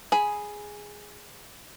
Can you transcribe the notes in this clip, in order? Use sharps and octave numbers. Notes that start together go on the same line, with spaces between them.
G#4 B5